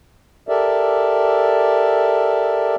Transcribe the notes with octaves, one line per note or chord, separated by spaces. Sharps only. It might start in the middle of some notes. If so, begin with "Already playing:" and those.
G4 A4 A#4 D5 E5